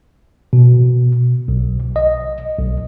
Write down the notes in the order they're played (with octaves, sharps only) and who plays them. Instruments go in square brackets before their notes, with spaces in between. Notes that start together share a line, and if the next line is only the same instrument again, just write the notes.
[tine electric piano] B2
B1
D#5
B1